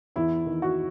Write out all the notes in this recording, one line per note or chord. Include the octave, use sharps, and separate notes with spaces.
E2 E4
D#3
F#4